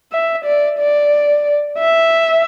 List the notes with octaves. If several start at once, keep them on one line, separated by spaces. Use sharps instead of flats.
E5
D5
D5
E5